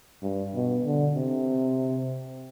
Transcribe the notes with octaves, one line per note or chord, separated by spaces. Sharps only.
G2
B2
D3
C3